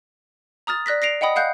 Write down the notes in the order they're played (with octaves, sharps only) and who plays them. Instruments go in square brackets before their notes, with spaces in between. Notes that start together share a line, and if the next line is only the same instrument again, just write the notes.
[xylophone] A#5 D#6 F6 A6
D5 F#6 A#6 B6
A#6 C7 D7 F7
D#5 F#5 G5 B5 D#6
F5 F#5 F#6 G6